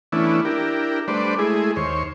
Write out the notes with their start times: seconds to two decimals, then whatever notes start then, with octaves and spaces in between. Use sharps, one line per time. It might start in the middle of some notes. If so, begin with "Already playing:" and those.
0.12 E3 A3 B3 C#4 D4 E4
0.45 D4 E4 G4 A#4
1.08 G3 A3 D4 B4 C5 D5
1.38 G#3 A3 E4 G#4
1.76 D#2 C5 C#5